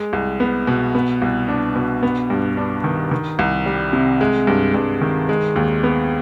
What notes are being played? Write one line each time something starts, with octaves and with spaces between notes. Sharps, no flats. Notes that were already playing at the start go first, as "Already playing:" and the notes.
Already playing: G#3
C2
B3
B2
B3
C2
D4
B2
B3
G2
D4
D#3
D#3
C2
G3
C3
G#3
G2
G2
D#3
G#3
D#2
B3